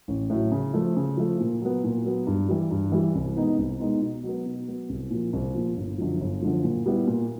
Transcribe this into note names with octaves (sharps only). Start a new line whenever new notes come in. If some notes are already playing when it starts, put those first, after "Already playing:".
A1
A2 F#3
C#3
F3 A3
C#3
F3 A3
A#2
F#3 B3
A#2
F#3 B3
G2
E3 G3
G2
E3 G3
C2
B2 G#3 B3 D#4
C2
B2 G#3 B3 D#4
B2
F#3 B3
B2
F#3 B3
C2
A#2 F3
C2
A#2 F3
G1
F#2 D3 F3
G1
F#2 D3 F3
A#2
G3 B3 E4
A#2